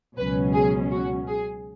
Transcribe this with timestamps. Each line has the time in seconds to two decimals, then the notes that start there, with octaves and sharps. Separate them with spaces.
0.16 C#2 B2 F#3 C#4 B4
0.53 G#4
0.91 F#4
1.27 G#4